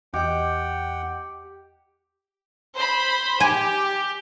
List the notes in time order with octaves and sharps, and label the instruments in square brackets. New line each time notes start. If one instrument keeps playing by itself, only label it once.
[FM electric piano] E2 D#5 [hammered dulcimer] G4 [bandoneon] F#5 G5
[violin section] C5 B5
[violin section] G4 [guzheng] G#5